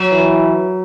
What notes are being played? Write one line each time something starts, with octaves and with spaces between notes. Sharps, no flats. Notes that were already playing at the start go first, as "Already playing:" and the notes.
Already playing: F#3
E3